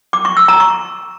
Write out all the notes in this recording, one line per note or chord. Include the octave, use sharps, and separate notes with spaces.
D6
C#6
E6
A#5
C#6